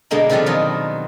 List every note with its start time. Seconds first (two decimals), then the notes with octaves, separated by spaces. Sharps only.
0.11 B2 D3 G#3 A#3
0.30 C3 D#3 F3 G3 B3
0.46 B2 D#3 F#3 F4